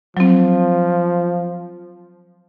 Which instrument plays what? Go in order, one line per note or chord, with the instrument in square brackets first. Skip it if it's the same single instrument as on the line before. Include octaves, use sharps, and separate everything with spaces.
[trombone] F3 [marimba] F#3 C4